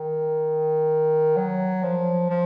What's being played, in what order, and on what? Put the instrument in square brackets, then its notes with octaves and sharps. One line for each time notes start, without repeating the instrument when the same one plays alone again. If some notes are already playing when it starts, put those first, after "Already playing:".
Already playing: [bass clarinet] D#3
F#3
F3
F3